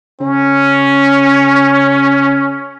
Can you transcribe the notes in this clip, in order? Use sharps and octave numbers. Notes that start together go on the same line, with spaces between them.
C#3 C#4